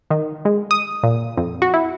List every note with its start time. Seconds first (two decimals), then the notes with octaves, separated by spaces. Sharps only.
0.11 D#3
0.45 G#3
0.71 D#6
1.03 A#2
1.37 F2
1.62 F#4
1.74 E4